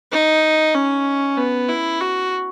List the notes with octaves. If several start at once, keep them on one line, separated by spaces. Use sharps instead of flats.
D#4
C#4
B3
E4
F#4